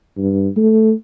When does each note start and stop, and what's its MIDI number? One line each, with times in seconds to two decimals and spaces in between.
0.17 0.48 43
0.57 0.94 57